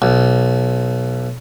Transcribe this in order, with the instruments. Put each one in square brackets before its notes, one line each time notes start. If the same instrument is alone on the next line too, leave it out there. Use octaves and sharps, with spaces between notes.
[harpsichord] B1